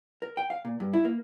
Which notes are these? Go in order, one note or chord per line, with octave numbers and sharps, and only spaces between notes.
A#4
G5
F5
A#2
G2
E4
A#3